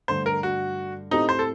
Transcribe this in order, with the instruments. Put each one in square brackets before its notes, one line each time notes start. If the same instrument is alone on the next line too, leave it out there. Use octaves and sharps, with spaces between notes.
[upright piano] G2 D3 A3 [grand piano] C5
[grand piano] A#4
F#4
[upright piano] A2 A3 C4 G4 [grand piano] D#4
[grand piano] C5
A4